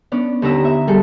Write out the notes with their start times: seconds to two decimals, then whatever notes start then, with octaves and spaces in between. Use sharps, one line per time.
0.12 B3 C#4 D4
0.42 D#2 D3 B3 B4 A#5 E6
0.65 E5
0.87 G3 G#4 A4